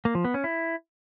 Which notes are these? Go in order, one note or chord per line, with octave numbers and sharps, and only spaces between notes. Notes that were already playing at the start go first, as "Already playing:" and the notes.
A#3
F3
B3
C#4
E4